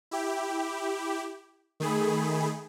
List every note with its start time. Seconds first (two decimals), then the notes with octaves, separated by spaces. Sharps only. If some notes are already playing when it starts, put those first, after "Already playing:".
0.11 E4 G4
1.80 D#3 A3 G#4 B5